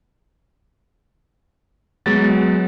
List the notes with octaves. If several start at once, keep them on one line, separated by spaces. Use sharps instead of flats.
F#3 G#3 B3 A6